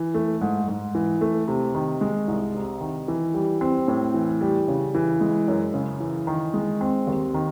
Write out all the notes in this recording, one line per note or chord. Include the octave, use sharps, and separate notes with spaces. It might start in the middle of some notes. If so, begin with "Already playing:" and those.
Already playing: E3
A3
G#2
G#2
E3
A3
C3
D#3
G#3
C2
C3
D#3
E3
G3
C4
A2
E3
G3
C#3
E3
G#3
F#2
C#3
E3
D#3
G#3
C4
D#2
D#3